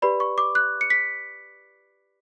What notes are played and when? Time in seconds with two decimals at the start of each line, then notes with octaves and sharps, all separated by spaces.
0.02 G4 B4 D5 B5
0.20 C#6
0.38 D6
0.55 F#6
0.81 C#7
0.90 B6